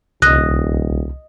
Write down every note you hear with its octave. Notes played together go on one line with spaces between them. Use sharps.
D#1 C2 D#5 F#6